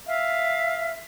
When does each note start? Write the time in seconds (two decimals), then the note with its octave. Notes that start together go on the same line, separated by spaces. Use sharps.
0.07 E5 F5